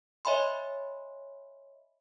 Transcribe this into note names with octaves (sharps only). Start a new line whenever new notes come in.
C#5 D#5 E5 G#5 B5 C6